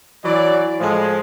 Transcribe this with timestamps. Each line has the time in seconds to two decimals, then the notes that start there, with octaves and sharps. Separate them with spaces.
0.24 E3 F#3 D5
0.80 A2 F3 G#3